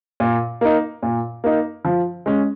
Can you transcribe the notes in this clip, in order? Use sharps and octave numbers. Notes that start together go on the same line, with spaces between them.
A#2
A#3 D#4
A#2
A#3 D#4
F3
G#3 C#4